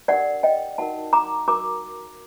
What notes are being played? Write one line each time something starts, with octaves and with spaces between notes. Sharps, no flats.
D4 G4 A#4 D5 F#5
D#5 G5
D#4 F#4 A#4 F#5 A5
A#5 D6
F#4 A#4 A#5 D6